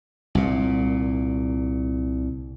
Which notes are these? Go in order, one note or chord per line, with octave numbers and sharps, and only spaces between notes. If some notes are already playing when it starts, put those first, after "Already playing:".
C2 A#2